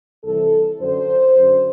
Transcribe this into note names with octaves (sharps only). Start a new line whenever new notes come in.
C2 C3 E3 A4
F#2 D3 C5
F#2 D3